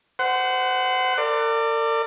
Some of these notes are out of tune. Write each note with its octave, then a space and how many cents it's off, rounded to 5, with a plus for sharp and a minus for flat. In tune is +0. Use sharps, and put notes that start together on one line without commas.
C5 -25 F#5 +15
A#4 -45 D5 +10